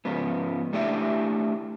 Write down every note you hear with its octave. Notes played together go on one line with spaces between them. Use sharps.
G#2 C#3 F3 B3
A3 D4 E4 G4 D5 E5